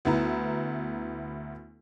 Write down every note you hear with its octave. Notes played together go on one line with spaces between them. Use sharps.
D2 B3 E4 A#5